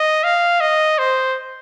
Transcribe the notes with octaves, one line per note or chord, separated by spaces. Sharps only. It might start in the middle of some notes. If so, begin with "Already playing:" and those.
Already playing: D#5
F5
D#5
C5